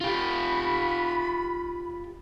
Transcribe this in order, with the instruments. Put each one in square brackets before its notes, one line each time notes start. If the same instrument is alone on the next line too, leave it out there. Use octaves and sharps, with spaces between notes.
[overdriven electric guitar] F4 G4 [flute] B5